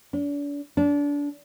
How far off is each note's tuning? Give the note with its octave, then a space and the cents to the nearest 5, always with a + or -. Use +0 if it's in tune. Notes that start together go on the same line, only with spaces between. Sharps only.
D4 -40
D4 -30